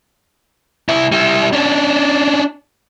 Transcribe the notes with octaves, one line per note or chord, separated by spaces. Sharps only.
C2 E4
G3 E4
C#4 D4